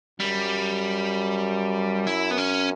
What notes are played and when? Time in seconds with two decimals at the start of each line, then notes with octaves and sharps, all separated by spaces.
0.20 F#2 G3
2.07 E4
2.31 B3
2.38 C#4